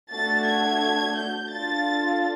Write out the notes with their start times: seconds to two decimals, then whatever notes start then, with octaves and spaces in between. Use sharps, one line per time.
0.10 A3 D4 F#4 A4 A6
0.45 G#6
1.16 G6
1.50 D4 F4 A4 A6